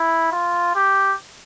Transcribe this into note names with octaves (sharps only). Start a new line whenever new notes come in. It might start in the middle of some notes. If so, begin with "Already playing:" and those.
Already playing: E4
F4
G4